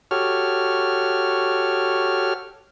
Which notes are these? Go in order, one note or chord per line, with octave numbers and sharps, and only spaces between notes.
F#4 G4 A4 C#5 F6